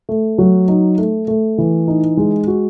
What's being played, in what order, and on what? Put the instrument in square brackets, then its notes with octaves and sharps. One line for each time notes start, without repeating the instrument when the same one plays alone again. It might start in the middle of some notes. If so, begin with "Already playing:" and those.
[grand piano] A3
F#3
D#4
A3
A3
E3
D#4
G#3
F#4